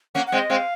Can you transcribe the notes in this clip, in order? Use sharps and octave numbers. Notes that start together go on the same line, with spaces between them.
A#3 C#4 F#5
F#5
G#3 C4
D#5
G#3 C4 F5